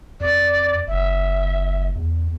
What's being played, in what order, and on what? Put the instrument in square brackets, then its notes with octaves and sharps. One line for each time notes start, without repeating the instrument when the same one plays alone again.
[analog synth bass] F2 [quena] D5
[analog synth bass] F#1 [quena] E5
[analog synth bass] E2